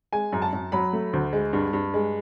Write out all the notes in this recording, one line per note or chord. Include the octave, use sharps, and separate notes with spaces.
G#3 G#5
F#2
A5
F#2
F#3 B5
A3
D2
G#3
G2
G2
G#3